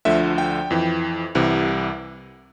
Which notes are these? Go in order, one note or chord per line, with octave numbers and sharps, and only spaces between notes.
D2 D3 F3 E5
G5
F2 E3
C2 C3 E3